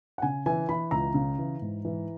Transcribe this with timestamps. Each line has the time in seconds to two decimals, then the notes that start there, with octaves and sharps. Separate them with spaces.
0.18 F#5
0.22 C#3 G#5
0.46 E3 G#5
0.69 E3 B5
0.91 C#2 A#5
1.14 C#3
1.39 E3
1.62 G#2
1.85 E3